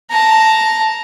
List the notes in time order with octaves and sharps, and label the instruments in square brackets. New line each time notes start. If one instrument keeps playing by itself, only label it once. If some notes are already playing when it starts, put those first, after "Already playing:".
[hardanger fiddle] A5 A#5